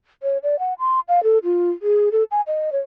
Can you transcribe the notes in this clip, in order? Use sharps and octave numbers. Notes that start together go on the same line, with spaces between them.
C#5
D5
F#5
C6
F5
A4
F4
G#4
A4
G#5
D#5
C#5